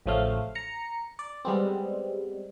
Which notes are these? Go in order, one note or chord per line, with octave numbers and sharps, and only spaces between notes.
A1 C#3 F3 F#3 A3 F5
A#5 C#7
D5
G3 G#3 B3 C4